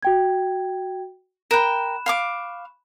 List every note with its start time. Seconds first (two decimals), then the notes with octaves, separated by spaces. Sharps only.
0.03 F#4 G5 G#6
1.51 A#4 G5 B5 F#6 E7
2.06 F5 C#6 D6